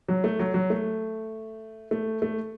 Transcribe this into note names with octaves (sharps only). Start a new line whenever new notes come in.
F#3
A3
F#3
F#3
A3
A3
A3